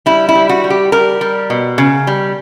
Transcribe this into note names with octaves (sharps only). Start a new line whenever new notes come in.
G3 E4
E4
G3
F#4
G3
G4
G3 A#4
G3
B2
C#3
G3